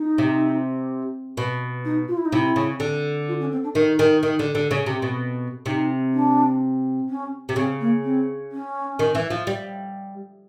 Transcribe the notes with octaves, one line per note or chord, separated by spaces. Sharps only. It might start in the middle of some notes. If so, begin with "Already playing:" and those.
Already playing: D#4
C3
B2
D#4
F4
E4
D#4
C3 E4
C#3
D3
F4
C#4
C4
D4
D#3 D#4
D#3
D#3
D3
D3
C#3
C3
B2
C3 D#4
D4
C#4
C3
C#3 C4
A#3
C4
C#4
D#3
E3
F3
G3